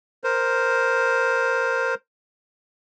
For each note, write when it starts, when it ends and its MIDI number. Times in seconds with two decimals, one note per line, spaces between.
0.24 1.95 70
0.24 1.95 72